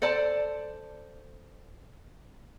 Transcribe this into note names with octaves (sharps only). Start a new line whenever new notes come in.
A4 C5 D5 A5